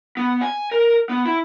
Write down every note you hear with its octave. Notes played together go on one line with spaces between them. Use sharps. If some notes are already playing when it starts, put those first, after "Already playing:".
B3
G#5
A#4
B3
E4